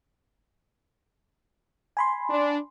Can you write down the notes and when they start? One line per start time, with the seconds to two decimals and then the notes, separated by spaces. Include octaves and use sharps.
1.97 G#5 B5 C6
2.30 D4